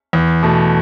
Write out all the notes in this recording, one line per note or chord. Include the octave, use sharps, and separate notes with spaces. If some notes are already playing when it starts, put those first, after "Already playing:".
E2
B2 A3